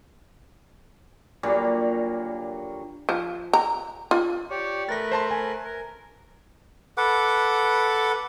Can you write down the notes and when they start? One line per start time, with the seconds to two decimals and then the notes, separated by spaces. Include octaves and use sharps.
1.43 A#2 D3 F#3 G3
3.09 F3
3.53 A#5
4.11 F4
4.50 G4 C#5 D5
4.89 A3 A#4 B4 A6 A#6
5.12 C5 A5 C6
5.31 G#5
5.65 A#4
6.97 A4 B4 F#5 D6